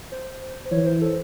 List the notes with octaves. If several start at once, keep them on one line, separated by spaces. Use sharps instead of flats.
C5
E3 C#5
C5
A4